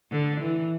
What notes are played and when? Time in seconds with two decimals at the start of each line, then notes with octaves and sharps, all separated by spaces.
0.11 D3
0.41 E3